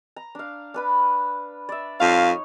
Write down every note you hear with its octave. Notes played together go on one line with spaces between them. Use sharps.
A#5
D4 F5
D4 B4 B5
D5 E5
F2 D#4 C#5 F5